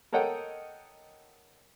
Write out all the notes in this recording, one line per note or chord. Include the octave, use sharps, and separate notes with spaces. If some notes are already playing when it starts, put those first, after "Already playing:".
A4 A#4 C#5 D#5 F#5 G5